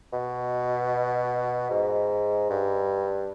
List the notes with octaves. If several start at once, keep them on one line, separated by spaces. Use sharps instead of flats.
B2
G#2
G2